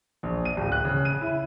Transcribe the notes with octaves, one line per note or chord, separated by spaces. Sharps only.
A#1
D#7
D1
F#6
C#3
D#7
E4